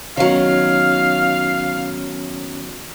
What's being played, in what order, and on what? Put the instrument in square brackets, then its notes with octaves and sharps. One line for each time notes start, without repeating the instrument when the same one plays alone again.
[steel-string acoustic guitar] D#3 F#3 [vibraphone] B3 C#4 C#5 [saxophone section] F5